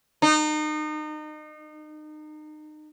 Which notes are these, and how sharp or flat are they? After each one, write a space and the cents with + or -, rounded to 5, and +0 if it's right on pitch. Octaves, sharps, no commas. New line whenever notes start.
D#4 -30